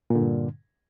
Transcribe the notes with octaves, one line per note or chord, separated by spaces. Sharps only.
G2 A#2 D3